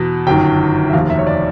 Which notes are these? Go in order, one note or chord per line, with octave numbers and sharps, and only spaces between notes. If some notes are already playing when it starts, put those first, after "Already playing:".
Already playing: E2 B2
G1 F#2 D#3 G5
E5
F1 D#2 D#3 F5
E5
C#5
D5